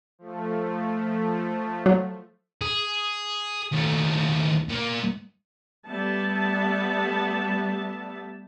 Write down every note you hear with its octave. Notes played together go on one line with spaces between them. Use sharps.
F3 A3
F#3
G#4
D#2 A3
A#2 A#3
G3 A3 B3 E5 A5